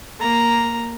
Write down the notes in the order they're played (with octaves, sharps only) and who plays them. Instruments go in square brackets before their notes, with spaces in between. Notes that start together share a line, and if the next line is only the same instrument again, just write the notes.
[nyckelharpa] A#3 A#5